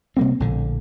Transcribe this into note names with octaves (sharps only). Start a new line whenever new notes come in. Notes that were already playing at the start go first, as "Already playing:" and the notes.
C3 G3 A#3 C4
A#1 A2 D3